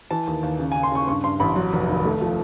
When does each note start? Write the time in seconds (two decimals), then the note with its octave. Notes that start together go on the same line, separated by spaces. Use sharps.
0.11 E3 A5
0.27 D#2
0.43 D#2
0.59 C#3
0.72 G#5
0.75 C#3
0.83 C6
0.91 C#3 C#6
1.07 G2 C#6
1.24 G2 C6
1.40 A1 B5
1.56 F#3
1.73 F1
1.89 D#2
2.05 A3
2.21 F3